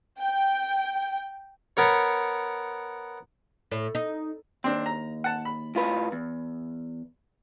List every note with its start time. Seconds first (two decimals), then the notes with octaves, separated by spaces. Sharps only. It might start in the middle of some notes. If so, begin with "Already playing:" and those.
0.20 G5
1.77 B3 A#4 C#5
3.72 A2
3.95 D#4
4.64 D#2 C4 D4
4.86 A#5
5.24 F#5 A5
5.45 B5
5.75 A2 F4 B4
6.12 E2